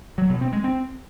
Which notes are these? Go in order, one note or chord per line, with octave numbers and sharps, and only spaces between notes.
F#3
B2
C4
G#3
C4